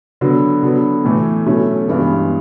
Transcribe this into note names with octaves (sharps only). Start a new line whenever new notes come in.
D3 F#3 B3
D3 F#3 B3
A2 E3 A3
B2 F#3 A3 C#4
G2 E3 G#3 B3